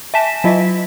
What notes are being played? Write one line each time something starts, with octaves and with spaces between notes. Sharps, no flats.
E5 G#5 A5 B6 E7
F#3 F4 D#5 E5 B6